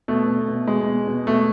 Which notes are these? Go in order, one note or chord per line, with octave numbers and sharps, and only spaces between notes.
B2 A3
B2
B2
B2 G#3
B2
B2
B2 A3